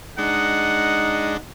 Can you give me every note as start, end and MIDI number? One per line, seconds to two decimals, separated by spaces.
0.18 1.37 56
0.18 1.37 62
0.18 1.37 63
0.18 1.37 75
0.18 1.37 78